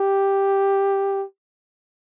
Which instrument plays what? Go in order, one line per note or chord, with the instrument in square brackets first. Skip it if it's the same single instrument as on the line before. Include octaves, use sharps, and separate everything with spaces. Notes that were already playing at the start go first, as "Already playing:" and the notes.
Already playing: [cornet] G4